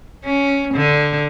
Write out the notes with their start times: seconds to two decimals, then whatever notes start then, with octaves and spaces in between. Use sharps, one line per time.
0.25 C#4
0.74 D3